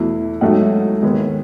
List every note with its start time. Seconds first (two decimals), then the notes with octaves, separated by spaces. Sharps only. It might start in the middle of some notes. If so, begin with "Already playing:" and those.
Already playing: E2 B2 A3 E4
0.41 G#2 F#3 A3 D#4 D#5 F#5
1.03 D#2 D#3 G#3 B3